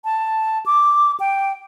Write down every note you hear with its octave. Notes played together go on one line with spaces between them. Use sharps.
A5
D6
G5